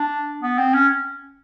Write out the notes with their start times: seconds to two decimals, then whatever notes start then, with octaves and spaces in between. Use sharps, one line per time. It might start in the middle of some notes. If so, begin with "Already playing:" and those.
Already playing: D4
0.43 B3
0.58 C4
0.74 C#4